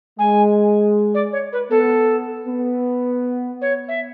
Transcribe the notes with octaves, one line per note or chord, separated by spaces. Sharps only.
G#3 G#5
D5
C#5
B4
B3 A4
B3
C#5
E5